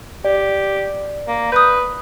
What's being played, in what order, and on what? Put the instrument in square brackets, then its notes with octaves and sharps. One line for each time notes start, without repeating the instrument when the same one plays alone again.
[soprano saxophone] G4 [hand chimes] D5
[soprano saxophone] A#3
[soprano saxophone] B4 [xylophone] D#6 F#6 G6